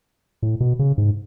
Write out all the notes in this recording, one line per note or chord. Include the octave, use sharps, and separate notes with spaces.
A2
B2
C#3
G#2